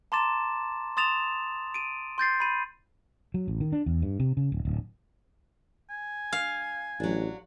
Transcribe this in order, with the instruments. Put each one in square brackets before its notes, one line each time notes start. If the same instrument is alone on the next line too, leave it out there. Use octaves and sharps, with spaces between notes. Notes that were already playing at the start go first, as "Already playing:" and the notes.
[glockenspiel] A5 A#5 C6 D6 A6 E7
C6 D#6 A6 E7 F7
D7 D#7
C6 G6 A6 C7
B5 D#7
[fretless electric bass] F#3
A1
D#3
D4
E2
G2
C3
C#3
D1
D1
[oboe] G#5
[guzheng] F5
[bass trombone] A1 [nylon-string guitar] F#3 D4